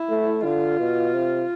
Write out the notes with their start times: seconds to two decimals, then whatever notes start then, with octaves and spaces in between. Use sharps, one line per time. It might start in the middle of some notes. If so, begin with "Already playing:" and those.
Already playing: E4
0.10 A3
0.44 D3 F4
0.80 B2
1.14 C3